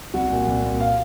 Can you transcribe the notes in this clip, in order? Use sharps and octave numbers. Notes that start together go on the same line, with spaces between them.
C2 F#4
A#2
C2
A#2
F5